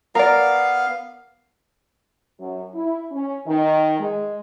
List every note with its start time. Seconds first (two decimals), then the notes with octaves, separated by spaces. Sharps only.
0.15 B3 A#4 D5 F5
2.39 F#2
2.73 E4
3.11 C#4
3.46 D#3
3.98 G#3